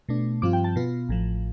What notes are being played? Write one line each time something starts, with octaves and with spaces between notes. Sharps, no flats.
B2 A3 D4
G2 F3 C4 F4 D6
G5
A5
B2 B3 F4
A1 A2 F3